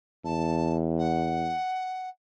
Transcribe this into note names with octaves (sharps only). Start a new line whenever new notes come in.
E2 A5
F#5